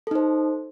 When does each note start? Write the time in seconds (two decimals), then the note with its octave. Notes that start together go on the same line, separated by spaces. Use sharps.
0.07 A4
0.11 D#4
0.15 C5